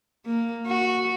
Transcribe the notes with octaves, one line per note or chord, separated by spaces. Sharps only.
A#3
F#4